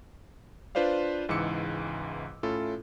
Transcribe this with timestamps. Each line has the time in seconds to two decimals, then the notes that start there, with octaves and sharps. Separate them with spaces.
0.75 D4 F4 B4 C5 D5 F5
1.29 C#2 G#2 E3 D6 E6 C#7
2.43 A2 C#4 E4 F4 A4